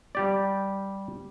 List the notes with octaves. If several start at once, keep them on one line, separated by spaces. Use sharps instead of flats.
G3 G4 D5